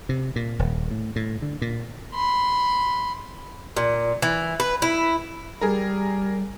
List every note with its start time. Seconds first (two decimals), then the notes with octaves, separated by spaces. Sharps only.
0.09 C3
0.36 A#2
0.59 D#1
0.91 A2
1.16 A2
1.42 D3
1.62 A#2
2.14 B5 C6
3.77 A#2
4.22 E3
4.60 B4
4.82 E4
5.61 G3 G#4 A#4